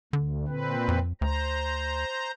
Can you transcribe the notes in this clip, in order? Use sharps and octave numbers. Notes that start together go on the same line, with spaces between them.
D2 D3
A#2 C4 B4
F2
D2 C5 A#5